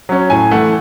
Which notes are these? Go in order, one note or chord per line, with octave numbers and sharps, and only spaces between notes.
F#3 C#4
A2 G#5
E3 A3 F#5